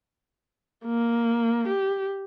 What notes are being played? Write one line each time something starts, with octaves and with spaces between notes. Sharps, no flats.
A#3
G4